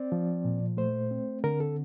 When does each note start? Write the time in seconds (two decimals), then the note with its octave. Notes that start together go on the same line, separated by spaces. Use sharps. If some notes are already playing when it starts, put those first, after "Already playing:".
Already playing: C4 D5
0.12 F3
0.45 A#2
0.77 A3 C5
1.11 C4
1.44 D3 A#4
1.60 A4